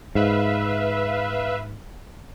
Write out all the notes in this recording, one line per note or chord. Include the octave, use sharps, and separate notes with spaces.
G#2 B4 E5 F5